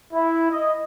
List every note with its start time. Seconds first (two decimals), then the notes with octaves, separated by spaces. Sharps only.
0.13 E4
0.50 D#5